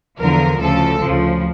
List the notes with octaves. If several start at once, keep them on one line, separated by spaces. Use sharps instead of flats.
E2 D3 F3 A#4
D2 C#3 F3 A4
D2 C#3 F3